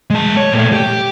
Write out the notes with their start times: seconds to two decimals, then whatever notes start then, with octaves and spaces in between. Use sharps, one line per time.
0.10 G#3 A5
0.37 C#5
0.52 A#2 A3
0.73 G4